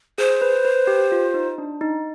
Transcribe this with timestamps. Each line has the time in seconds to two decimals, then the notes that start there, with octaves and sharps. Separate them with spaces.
0.18 G#4 C5
0.42 B4
0.65 B4
0.87 G4
1.12 F4
1.34 D#4
1.58 D4
1.81 D#4